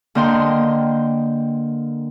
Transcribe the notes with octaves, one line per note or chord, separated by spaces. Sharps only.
D3 A#3 D#5 G5 A#5 C6